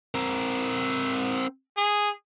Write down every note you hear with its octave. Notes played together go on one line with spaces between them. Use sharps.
C4 A#4
G#4